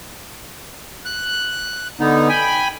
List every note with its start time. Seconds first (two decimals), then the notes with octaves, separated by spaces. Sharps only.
1.05 F#6
2.00 D3 B3 D#4
2.29 G5 G#5 B5